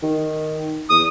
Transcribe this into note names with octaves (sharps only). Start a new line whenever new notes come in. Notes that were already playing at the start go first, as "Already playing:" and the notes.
D#3
E2 D#6